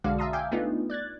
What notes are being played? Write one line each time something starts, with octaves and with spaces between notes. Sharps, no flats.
B1 D3 G#3 F#4 D5 F5
E5 F5 A5 A#5 C6 D#6
E5 F5 G5 G#5 D6 G6
A3 B3 D4 D#4 F4
D5 F#6 G#6 A6